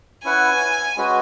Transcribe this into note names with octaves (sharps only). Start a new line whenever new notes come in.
C#4 E4 B4 F#5 G#5
G#3 C#4 F#4 B4